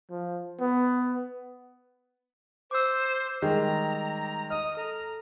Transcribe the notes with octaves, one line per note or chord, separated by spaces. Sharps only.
F3
B3
C5 D6 E6
D#3 G3 G#3 A#5
D#5 D#6 F6
A4 A#5